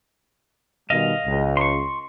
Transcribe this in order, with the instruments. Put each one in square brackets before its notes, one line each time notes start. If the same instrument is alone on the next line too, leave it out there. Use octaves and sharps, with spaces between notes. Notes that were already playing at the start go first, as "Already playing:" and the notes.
[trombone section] B2 D#3 G3 [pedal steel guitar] D#5 F5
[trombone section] C#2
[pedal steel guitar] C6 C#6